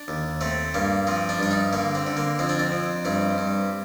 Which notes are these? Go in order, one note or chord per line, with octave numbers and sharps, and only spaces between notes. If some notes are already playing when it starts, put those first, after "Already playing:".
Already playing: D4
D#2
A3 C4
G2 A#3
F3 C4
D4
G2 D4
D#4
D3 A#3
C4
D3
A#3
F2 C4
D4
C4
F2
G2 C4
G2